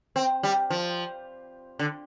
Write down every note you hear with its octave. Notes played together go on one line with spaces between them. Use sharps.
C4
G3
F3
D3